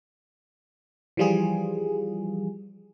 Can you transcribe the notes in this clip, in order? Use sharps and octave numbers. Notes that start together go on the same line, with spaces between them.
E3 F3 G3 F4 G#4